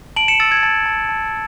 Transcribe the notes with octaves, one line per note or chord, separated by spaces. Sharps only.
A5 D7 F#7
C#7 E7
E6 A6
G#6
A5 A6
A5
A5